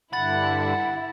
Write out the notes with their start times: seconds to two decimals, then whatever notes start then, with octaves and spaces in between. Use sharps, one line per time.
0.13 G2 D3 E4 F#5 B5 A6